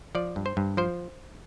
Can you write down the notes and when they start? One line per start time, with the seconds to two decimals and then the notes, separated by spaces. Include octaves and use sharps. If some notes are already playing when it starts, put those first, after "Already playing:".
0.15 F3 D5
0.36 G2
0.46 C5
0.57 G2
0.77 F3 C5